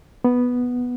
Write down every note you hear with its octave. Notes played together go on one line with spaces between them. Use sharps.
B3